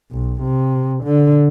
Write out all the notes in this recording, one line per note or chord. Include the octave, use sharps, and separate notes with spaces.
B1
C3
D3